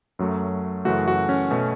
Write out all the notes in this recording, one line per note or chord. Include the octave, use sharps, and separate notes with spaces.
F#2 F#3 A3
F#2 C#3 E3 A3 F#4
F#4
C#4
B2 A3